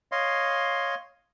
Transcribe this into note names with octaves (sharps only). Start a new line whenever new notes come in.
C#5 D#5 F5 C6